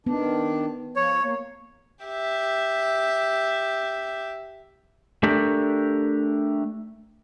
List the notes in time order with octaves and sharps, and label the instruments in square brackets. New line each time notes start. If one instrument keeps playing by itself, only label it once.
[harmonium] D#3 D4 [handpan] B3
[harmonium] F3 [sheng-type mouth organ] C#5
[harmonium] A#3
[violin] G4 E5
[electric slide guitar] A3 D4 G4 A#4